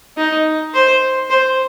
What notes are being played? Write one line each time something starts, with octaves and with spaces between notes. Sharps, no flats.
D#4
C5
C5